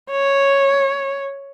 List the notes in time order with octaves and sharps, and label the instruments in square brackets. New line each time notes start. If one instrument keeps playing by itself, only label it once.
[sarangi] C#5